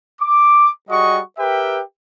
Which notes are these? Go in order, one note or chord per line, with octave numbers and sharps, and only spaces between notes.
D6
G3 F#4 G#4 D#5 C#6
G4 A#4 B4 E5 G5